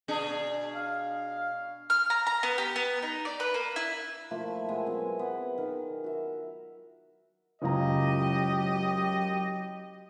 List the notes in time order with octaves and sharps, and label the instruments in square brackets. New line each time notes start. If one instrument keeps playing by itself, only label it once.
[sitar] B2 D4 G#4
[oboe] F5
[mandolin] F6
A#5
A#5
B3
G4
B3
D#4
D5
B4
A#3
E4
[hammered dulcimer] F3 A3 A#3 E4
G#3 B3 E5 G#5
F#3 C4
B3
D#3 A#4
F#4 E5
[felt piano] F#1 C#2 A#5 [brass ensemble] F#3 G4 D#5